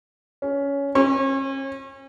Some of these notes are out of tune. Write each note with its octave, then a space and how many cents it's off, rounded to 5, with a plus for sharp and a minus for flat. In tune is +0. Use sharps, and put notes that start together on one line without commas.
C#4 +15
C#4 -40